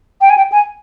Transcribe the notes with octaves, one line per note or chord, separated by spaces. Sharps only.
G5
G#5
G5
G#5